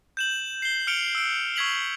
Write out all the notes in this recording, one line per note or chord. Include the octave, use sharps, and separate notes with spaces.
G6 E7 F#7
C7 G7
F6 C#7 D7 F7 G7
E6 D7
C#6 E6 G#6 B6 F7 F#7